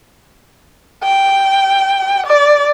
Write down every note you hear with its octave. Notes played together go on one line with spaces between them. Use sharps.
G5
D5